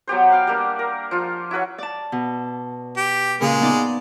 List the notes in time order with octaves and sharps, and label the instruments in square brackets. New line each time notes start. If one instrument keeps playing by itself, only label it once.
[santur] F#3 B3 G4 C5
B4 F5 G5
G3 A#3 D4
A#4
F3 F4
E4 F#4 B4 C#5
[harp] D5 A5
B2
[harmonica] G4
[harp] A#2 C#3 A#4 [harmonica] G#3
[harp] B3 D#4 D5